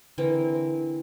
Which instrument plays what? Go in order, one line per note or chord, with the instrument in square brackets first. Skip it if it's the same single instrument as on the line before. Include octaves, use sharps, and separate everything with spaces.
[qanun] D3 E3 C4 A#4